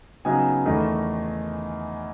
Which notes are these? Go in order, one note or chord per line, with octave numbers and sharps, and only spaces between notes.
C#3 F#3 B3 D#4 G#5
E2 D#3 A3 D#4